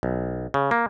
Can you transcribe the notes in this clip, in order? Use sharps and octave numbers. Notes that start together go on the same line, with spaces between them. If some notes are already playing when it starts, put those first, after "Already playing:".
B1
C#3
A#3